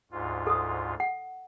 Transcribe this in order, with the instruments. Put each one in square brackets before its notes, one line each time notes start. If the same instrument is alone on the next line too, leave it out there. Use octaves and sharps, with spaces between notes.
[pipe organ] D2 G#2 F4
[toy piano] A4 D#6
F#5